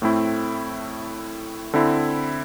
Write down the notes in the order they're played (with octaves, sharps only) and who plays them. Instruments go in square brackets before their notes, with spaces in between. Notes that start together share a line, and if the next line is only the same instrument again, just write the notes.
[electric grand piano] A2 A3 C4 E4
D3 C4 E4